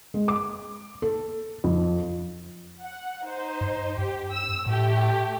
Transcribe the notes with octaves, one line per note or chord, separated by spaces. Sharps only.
G#3
D6
A4
F2
F#5
D#4 C5
G2
G2 G4
E6
A2 A3 G4